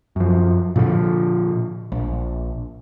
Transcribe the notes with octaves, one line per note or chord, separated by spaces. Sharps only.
F#2 F3
A#2 D3 D#3 F3
A#1